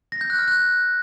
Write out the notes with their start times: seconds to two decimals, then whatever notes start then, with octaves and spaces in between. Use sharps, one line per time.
0.12 A#6
0.21 G6
0.30 F#6
0.39 F6
0.48 F#6